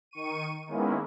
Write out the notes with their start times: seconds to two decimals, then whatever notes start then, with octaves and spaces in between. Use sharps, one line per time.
0.11 D#3 C#6 D#7
0.66 D#3 G#3 A#3 B3 C#4 E4